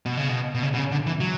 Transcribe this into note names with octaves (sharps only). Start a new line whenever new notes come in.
B2
C#3
B2
B2
C#3
B2
C#3
D3
E3
F#3